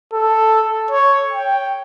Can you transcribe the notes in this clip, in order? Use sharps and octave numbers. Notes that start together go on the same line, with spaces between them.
A4
C#5
G5